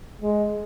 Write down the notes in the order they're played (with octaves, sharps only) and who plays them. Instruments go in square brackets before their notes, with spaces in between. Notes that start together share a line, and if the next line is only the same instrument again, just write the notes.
[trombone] G#3